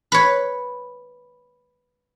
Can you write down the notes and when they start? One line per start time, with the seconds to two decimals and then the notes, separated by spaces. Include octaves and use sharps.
0.12 B4 C#5